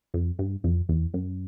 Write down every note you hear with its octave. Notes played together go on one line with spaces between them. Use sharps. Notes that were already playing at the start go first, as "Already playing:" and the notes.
F2
G2
F2
E2
F#2